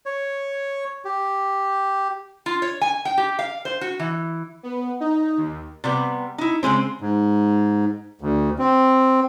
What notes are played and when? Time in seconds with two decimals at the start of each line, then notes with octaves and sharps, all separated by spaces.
0.06 C#5
1.05 G4
2.46 F4
2.62 C#5
2.81 G#5
3.05 G5
3.18 G4
3.39 F5
3.65 C5
3.81 F#4
3.99 E3
4.63 B3
5.00 D#4
5.37 D#2
5.84 C3 G3 B3
6.38 D#4 E4
6.63 C#3 F#3 G#3 C4
7.01 G#2
8.21 D2
8.59 C4